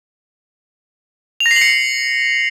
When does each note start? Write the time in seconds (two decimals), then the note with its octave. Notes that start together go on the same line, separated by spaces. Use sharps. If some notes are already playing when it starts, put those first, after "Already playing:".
1.40 F7
1.46 A#6
1.51 C7
1.56 F#7
1.61 C#7